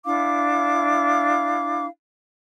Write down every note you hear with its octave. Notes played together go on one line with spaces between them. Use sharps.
D4 E4 F5 D6